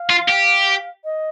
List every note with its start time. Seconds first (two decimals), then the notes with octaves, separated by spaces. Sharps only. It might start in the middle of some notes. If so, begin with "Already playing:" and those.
Already playing: F5
0.10 F4
0.29 G4
1.04 D#5